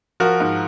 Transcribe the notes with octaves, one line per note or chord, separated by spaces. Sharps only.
F3 F#4 A#4
G#2